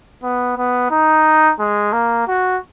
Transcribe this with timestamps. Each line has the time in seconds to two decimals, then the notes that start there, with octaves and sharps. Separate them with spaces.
0.23 B3
0.57 B3
0.91 D#4
1.59 G#3
1.93 A#3
2.27 F#4